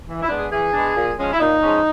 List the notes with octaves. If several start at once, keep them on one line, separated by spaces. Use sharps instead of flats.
E3
E4
G#3 B3 D4
G#4
E3 G#4
G#3 B3 D4
A#2
F3 G#3 C#4
E4
A#2 D#4
F3 G#3 C#4